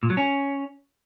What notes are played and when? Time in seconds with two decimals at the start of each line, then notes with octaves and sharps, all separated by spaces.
0.03 A#2
0.10 F#3
0.17 C#4